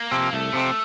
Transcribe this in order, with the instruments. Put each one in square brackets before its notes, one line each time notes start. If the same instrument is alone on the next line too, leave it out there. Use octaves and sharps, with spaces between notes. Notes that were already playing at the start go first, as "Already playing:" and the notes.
Already playing: [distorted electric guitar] A#3
[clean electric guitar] C3 F3 C4
[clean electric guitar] C2 [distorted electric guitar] A3
[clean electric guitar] C3 F3 C4